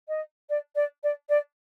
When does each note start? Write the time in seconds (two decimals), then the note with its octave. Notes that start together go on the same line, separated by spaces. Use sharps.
0.08 D#5
0.49 D5
0.75 D5
1.03 D5
1.29 D5